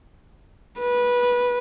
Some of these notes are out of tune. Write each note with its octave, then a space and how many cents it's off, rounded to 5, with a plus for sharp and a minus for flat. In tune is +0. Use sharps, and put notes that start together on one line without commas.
B4 -20